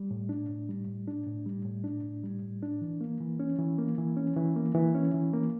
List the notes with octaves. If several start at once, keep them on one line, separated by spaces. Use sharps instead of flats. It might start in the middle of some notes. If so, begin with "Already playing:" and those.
Already playing: G3
A2
D4
A2
G3
A2
D4
A2
G3
A2
D4
A2
G3
A2
D4
E3
A#3
E3
C#4
E3
A#3
E3
C#4
E3
A#3
E3
C#4
E3
A#3